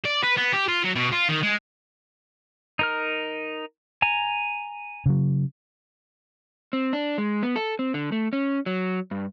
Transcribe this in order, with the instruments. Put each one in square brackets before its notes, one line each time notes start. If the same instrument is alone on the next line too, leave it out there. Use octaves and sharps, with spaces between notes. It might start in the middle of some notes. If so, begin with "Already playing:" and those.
[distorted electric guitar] D5
B4
B3
G4
F4
F#3
B2
F4
D#3
G#3
[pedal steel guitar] D#4 A#4 F6
G#5 A#5
[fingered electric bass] C#3 F#3
[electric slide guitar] C4
D4
G#3
B3
A4
C4
D3
A3
C#4
F#3
G2